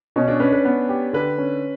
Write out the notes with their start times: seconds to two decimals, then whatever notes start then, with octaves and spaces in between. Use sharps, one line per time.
0.16 B2 C#4
0.28 D4
0.40 C#4 B4
0.52 B4
0.65 B3
0.89 G4
1.13 D3 B4
1.38 C#4